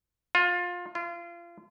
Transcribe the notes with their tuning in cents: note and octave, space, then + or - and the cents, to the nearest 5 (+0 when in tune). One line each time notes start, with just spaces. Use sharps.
F4 +20
F4 -30